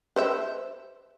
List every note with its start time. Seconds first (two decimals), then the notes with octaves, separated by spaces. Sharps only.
0.16 B4 C5 E5